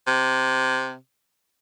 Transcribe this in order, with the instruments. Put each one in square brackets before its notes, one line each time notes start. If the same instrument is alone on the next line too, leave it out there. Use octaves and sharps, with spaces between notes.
[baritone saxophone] C3